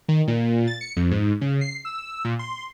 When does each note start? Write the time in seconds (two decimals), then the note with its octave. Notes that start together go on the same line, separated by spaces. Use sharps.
0.08 D#3
0.28 A#2
0.67 A6
0.81 C#7
0.96 F2
1.11 G#2
1.41 C#3
1.61 C7
1.85 E6
2.25 A#2
2.39 C6